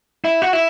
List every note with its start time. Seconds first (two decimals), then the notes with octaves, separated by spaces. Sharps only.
0.24 E4
0.42 F#4
0.53 E4